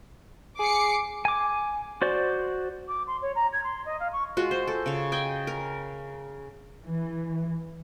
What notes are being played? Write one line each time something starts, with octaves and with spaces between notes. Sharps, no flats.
G#4 D6 C7 C#7
G#5 D6
F#4 C5 D5
D6
C6
C#5
A#5
G#6
C6
D#5
F5
C#6
G#3 F4 F#4
C5
A4
C#3 C#5
D#5 G5 G#5
A#4
E3